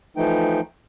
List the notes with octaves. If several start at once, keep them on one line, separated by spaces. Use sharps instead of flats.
E3 F3 A3 D#4 G5